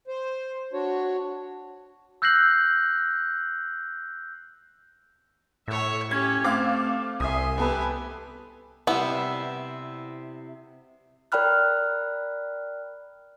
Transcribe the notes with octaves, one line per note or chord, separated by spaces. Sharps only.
C5
D4 F#4 C#5
E6 F#6 G6 A#6 C7 F#7
A2 C#5 E5
C#4 G4 G#6
A3 C4 F5 D6
C2 E5 G#5 C6 D#6
B3 G4 A4 B4 G#5
C3 G3 B3 E4 E5
A#4 D5 G5 B5 F6 F#6